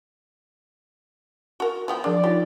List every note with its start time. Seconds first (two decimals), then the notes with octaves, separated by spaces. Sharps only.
1.60 F#4 A#4
1.88 F3 B3 G5
2.04 F3 D4 G#4 A#4 D5
2.24 D#4 F4 G4 C#5